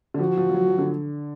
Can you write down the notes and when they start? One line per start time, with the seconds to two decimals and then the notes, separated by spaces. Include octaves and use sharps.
0.14 D3
0.19 F3 F#4
0.37 F3
0.50 F3
0.54 F#3
0.67 F3
0.78 D3